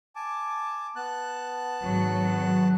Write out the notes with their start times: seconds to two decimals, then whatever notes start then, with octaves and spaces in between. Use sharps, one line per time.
0.16 G#5 A5 D6
0.96 B3 A5 F#6
1.81 G#1 F#3